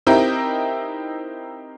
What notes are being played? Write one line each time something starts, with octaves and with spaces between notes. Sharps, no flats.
C4 D#4 E4 G4 A#4